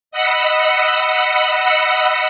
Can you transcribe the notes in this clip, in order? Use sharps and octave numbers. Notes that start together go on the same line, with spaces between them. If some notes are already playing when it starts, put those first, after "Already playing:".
D#5 F#5 B5 E6 C#7